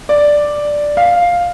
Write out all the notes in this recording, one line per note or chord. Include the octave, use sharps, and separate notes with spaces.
D5
F5